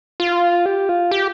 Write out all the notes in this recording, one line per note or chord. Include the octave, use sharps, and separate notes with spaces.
F4
G4
F4
G4